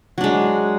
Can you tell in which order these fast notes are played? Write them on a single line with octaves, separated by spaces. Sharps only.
F#3 D4 G#3